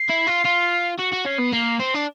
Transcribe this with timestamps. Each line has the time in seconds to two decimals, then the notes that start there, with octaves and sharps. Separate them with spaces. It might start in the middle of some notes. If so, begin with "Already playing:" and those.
Already playing: C7
0.10 E4
0.28 F4
0.45 F4
0.99 F#4 C#7
1.13 F#4
1.26 C#4 C7
1.39 B3
1.53 A#3 C7
1.79 C4 C7
1.95 D4